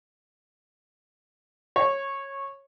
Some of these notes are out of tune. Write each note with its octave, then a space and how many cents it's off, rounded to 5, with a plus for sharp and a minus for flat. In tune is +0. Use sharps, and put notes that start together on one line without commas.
C#5 -15